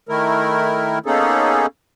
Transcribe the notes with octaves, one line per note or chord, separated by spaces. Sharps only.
D#3 A3 E4 A#4
A#3 B3 C#4 D#4 G#4 A4